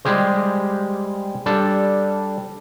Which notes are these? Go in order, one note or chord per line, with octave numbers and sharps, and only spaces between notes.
G3 G#3 G4 G#4 C5
G3 D4 A4